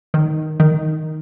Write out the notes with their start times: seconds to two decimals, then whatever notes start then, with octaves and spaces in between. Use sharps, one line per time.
0.14 D#3
0.60 D#3